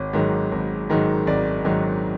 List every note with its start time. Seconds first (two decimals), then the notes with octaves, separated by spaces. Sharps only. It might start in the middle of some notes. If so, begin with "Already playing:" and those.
Already playing: G#1 C#5
0.13 G#2 D#3 F#3
0.52 G#1
0.90 G#2 D#3 F#3
1.27 G#1 D5
1.65 G#2 D#3 F#3